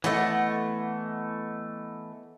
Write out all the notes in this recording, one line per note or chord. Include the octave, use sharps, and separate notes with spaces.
E3 A3 B3 D#5 F#5